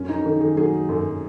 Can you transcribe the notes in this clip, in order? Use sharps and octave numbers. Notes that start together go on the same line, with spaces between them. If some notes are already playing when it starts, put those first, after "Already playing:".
Already playing: F#2 C#4
D#4
D#3
G#4
F#3 G#4
F#2